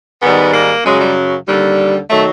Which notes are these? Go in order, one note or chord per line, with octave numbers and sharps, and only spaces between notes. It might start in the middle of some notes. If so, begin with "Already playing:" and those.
G#2 D#3 G3 B3
A#3
F#2 C#3 F#3 G#3
G3
D#2 D3 G3
D#3 F#3 A3